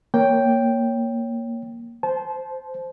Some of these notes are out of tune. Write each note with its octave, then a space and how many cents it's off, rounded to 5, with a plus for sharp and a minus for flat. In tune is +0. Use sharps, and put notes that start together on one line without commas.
A#3 +0 C#5 +0 G5 +0
C5 -5 A5 -25